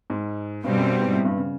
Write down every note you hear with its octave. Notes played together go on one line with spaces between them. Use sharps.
G#2
G2 B2 G3 C4
F#2
G2
G#2
A2
G2
C#3